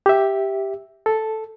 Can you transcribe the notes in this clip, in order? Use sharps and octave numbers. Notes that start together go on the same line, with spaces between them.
G4 E5
A4